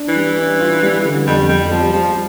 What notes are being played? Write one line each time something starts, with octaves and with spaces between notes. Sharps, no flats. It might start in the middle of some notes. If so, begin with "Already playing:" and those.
Already playing: D4
E3
G3
D4
F4
G3
D3
F2 G3
F2 G3
F3 G3
F3 G3